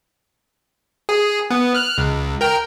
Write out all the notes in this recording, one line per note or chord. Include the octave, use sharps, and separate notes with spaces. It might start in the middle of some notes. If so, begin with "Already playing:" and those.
G#4
B3
F6 F#6
C#2
A#4 G5